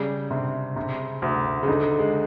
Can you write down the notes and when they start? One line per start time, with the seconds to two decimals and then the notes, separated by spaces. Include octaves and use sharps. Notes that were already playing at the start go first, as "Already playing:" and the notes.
Already playing: C#3 G3
0.31 C3
0.76 C3
1.22 D2
1.63 C#3
1.68 D3 D#4
1.99 G#3